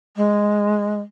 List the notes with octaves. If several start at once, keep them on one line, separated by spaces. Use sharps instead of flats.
G#3